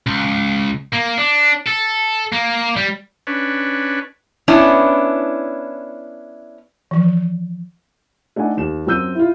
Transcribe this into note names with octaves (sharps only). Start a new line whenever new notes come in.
C#2
A#3
D4
A4
A#3
G3
C#4 D4 B4
B3 C#4 D4 E4
E3 F3
A3 D4 D#4 F#5 G#5
D#2 E7
F#2 C4 E6 G6 D#7
E4 F4